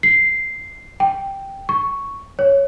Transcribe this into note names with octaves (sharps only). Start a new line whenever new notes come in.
C7
G5
C#6
C#5